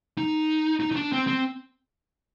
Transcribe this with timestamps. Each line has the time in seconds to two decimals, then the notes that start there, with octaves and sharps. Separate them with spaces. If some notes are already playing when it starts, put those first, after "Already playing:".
0.18 D#4
0.80 D#4
0.92 D#4
0.96 D4
1.12 C4
1.27 C4